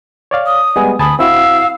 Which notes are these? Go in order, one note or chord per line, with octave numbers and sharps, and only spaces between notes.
C#5 D5 F5
D#6
G3 G#3 B3 G#5
D2 G#5 A5 B5 D#6
C4 E4 F#4 F5 E6